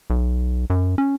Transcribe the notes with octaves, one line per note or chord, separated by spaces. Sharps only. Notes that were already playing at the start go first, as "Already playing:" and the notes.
B1
F#2
C#4